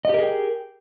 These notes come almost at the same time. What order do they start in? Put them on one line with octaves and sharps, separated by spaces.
D#5 G4 A#4 G#4 G5